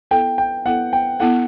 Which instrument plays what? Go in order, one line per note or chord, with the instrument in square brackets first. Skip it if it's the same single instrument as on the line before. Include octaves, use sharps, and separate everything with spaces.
[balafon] B3 E4 A4 [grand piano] G5
[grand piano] G5
[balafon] B3 E4 A4 [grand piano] F#5
[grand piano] G5
[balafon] B3 E4 A4 [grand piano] F#5